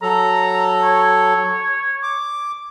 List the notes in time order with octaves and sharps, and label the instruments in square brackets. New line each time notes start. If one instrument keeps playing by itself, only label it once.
[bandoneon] F#3 A4 [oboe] A#5
[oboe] C#5
[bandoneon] D6